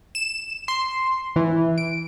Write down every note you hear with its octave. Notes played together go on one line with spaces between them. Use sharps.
E7
C6
E3
D7